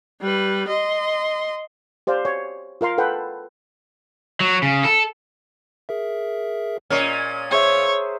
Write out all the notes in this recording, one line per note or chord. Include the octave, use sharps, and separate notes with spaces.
G3 B4
D#5 C6
G4 C5 D5 F5
C#5
F4 A#4 F5 C6
A4 B4 F#5 G5
F#3
C#3
A4
G#4 A#4 E5
A#2 C#4 A#4 D#5 G#6
G#4 C5 C#5 E5